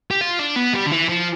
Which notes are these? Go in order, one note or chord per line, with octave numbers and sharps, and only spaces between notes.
G4
F4
D4
B3
G3
D3
E3
F3